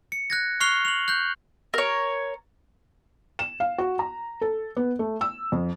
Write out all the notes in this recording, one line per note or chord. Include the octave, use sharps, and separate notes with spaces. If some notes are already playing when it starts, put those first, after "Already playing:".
C#7
F#6 G#6 A#6
C#6 F6 F#6 C7 F7 G7
F7 F#7
F#6 G6
A#4 C#5
E7
F5
F#4
A#5
A4
B3
A3
E6
F2